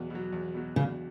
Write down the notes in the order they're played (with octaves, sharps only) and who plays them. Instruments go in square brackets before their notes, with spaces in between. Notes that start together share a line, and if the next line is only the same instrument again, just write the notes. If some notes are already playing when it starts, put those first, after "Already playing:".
Already playing: [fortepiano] E2 B2 F#3
B2 F#3
E2
B2 F#3
[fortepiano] E2 [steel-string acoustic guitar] C#3